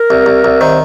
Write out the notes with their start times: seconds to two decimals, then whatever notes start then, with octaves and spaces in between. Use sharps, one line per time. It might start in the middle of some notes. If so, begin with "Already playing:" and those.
Already playing: A#4
0.10 C2
0.26 C2
0.44 C2
0.61 D#3 C5